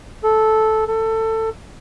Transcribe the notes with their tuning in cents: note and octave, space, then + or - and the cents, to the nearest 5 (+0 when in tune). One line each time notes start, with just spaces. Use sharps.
A4 -10
A4 +20